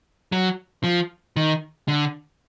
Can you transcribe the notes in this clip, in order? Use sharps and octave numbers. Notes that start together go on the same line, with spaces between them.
F#3
F3
D#3
D3